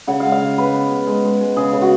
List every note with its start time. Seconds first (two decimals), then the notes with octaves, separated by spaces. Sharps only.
0.07 C#3 F#5
0.20 G#3 F5
0.32 F5
0.41 C#3
0.58 B3 B4
0.73 B3
0.91 B3
1.07 G#3
1.24 G#3
1.41 G#3
1.56 C#3 G#4
1.72 C#3
1.82 F#4